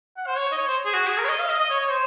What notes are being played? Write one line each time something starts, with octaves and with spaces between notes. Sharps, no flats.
F#5
C5
C#5
D#5
C#5
C5
G#4
F#4
G#4
A#4
C#5
D#5
F5
D#5
D#5
C#5
C#5
C5